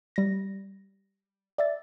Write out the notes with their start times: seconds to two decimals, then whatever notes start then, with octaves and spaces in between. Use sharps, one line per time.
0.16 G3 A#6
1.58 D5 E5 A6